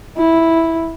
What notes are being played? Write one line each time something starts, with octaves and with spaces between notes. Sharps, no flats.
E4